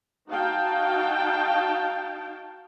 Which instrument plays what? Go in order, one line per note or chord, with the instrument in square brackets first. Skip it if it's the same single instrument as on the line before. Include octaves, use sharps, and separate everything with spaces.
[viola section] D#4 F#4 F5 G5 A5